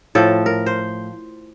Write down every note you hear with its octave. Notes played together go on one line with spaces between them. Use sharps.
A2 F3 A4
A#4
C5